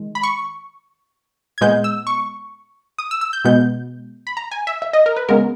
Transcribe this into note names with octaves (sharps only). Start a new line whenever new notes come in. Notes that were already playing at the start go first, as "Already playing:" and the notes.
Already playing: D#3 G#3
B5
C#6
G#6
A#2 G#3 B3 G6
E6
C#6
D#6
E6
E6
G6
B2 G#3 B3 G6
B5
A#5
G#5
E5
E5
D#5
A#4
B4
C#3 G#3 B3 A#4